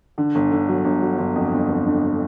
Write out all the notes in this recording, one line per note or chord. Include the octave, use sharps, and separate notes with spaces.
D3
G1
D3
F#3
G1
F#3
G1
F2
G1
F2
D3